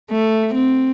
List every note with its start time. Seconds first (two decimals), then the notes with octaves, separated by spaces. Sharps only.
0.11 A3
0.55 C4